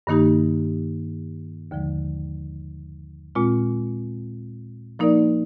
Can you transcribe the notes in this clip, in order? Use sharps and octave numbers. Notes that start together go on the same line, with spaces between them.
G2 D#3 A#3 D#4 G4
D#2 D3 F3 G#3
A#2 G#3 C4 F4
F3 A#3 D#4 A#4 D5